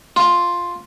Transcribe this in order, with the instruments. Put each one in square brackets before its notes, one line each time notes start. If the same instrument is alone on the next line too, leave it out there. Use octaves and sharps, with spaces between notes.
[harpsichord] F4